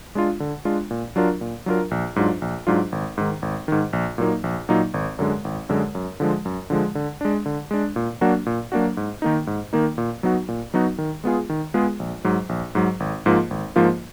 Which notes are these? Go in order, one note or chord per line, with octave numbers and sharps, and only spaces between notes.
G#3 D4 F4
D3
G#3 D4 F4
A#2
F#3 D4 F4 A#4
A#2
F#3 D4 F4 A#4
A#1
G#2 F#3 D4 F4
A#1
G#2 F#3 D4 F4
G#1
G#2 D#3
G#1
G#2 D#3
A#1
A#2 F#3 A#3 D#4
A#1
A#2 F#3 A#3 D#4
G#1
F#2 D3 G#3
G#1
F#2 D3 G#3
F#2
D3 F3 G#3
F#2
D3 F3 G#3
D3
G#3 D4
D3
G#3 D4
A#2
F#3 A#3 D4 F#4
A#2
F#3 A#3 D4 F#4
G#2
D#3 A#3 D#4
G#2
D#3 A#3 D#4
A#2
F#3 B3 D#4 F#4
A#2
F#3 B3 D#4 F#4
D#3
G#3 B3 F4 G#4
D#3
G#3 B3 F4 G#4
A#1
G#2 F#3
A#1
G#2 F#3
G#1
G#2 F3 A#3 F4
G#1
G#2 F3 A#3 F4